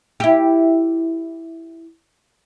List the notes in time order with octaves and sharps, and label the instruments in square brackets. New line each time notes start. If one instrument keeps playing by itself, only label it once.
[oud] E4 G4